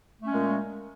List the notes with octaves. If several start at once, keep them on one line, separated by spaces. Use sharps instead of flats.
A#2 G#3 A3 C#4